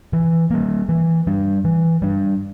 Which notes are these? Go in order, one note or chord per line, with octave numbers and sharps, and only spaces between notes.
E3
G3 A#3
E3
G3 D4
E3
G3 D4